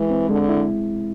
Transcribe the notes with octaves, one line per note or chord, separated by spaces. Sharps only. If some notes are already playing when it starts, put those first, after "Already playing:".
Already playing: E3 G#3
C4
D3 G#3
E4